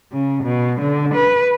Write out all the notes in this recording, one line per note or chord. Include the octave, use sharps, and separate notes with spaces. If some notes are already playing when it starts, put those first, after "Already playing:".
C#3
B2
D3
B4